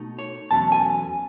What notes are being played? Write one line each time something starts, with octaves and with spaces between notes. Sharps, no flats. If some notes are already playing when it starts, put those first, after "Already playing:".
Already playing: B2 A3 D#4
C#5
E2 B2 F#3 A3 C#4 A5
G#5